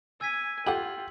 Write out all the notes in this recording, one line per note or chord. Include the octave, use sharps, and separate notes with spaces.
G#5 E6 G#6 B6
F4 G4 A4 F#5 G5 F#7